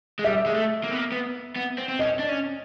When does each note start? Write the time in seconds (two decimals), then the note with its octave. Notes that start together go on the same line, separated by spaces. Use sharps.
0.19 G#3
0.24 G3 E5
0.46 G#3
0.54 A3
0.84 A#3
0.91 B3
0.98 A#3
1.12 B3
1.56 B3
1.78 C4
1.89 C4
1.99 C#4 D#5
2.19 D4
2.29 C#4